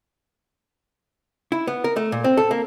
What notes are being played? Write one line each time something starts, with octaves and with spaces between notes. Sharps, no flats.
E4
B3
A#4
A3
A#2
C4
A4
A#3